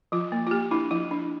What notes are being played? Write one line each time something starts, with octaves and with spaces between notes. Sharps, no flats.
F3 F4
A#3
F4
A#3 G4
D4 E4
F3 E4
D4